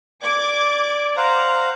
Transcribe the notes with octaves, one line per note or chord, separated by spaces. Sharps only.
D5 D6 G#6 D7
C5 F5 F#5 A#5